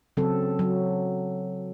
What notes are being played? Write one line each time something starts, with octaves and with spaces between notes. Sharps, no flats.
C#3 F#3 C4 A4
F#3